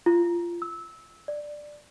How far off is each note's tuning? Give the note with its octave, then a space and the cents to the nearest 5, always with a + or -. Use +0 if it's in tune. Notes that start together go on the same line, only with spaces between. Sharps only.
F4 -20
E6 -20
D5 +10